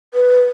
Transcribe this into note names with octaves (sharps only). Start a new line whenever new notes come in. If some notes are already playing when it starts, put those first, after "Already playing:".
B4